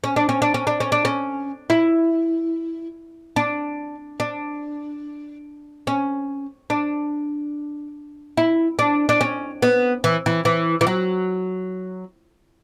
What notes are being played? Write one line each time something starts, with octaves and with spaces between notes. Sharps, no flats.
C#4
D4
C#4
D4
C#4
D4
C#4
D4
C#4
E4
D4
D4
C#4
D4
E4
D4
D4
C#4
B3
E3
E3
E3
E3
F#3